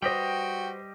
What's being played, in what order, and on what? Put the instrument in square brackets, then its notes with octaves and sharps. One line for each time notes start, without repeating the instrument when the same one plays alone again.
[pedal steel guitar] G3 G4 D#5 [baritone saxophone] F#4 [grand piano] B4 C5 [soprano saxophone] G5